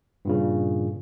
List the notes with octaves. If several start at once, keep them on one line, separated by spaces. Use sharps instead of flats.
G2 A#2 C#3